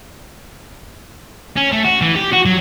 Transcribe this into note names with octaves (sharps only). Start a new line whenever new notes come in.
C#4
A3
F#4
E3
G4
F#4
F#3